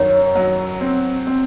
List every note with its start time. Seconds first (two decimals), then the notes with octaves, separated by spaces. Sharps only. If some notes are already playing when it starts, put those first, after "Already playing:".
Already playing: F#2 D#3 C#5
0.35 F#3
0.81 C4
1.27 C4